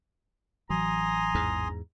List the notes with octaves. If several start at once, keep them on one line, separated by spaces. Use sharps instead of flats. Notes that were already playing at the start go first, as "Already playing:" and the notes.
A1 E3 F#3 G#5 A#5 C6 D#6
E2 G#2